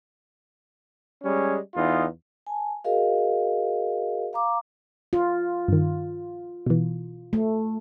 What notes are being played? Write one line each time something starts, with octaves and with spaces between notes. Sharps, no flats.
G3 G#3 C#4
E2 D#4 F4
G#5 A5
F#4 G#4 A#4 D#5 F5
F5 A#5 D6
F4
G2 D#3
B2 E3
A3